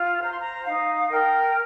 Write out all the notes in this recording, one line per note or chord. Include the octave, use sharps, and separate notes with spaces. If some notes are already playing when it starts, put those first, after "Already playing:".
Already playing: F4
C5 A#5
C6
A#5
D#4 F5
A#4 G5